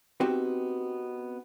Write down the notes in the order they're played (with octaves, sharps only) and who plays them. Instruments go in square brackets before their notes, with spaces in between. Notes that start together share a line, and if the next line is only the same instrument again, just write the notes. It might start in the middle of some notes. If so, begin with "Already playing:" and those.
[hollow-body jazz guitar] B3 C4 D#4 F#4 G4